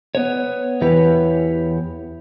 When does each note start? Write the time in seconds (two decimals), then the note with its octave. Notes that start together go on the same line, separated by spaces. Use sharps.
0.15 B3 C#5
0.81 E2 E3 G4 B4 C#5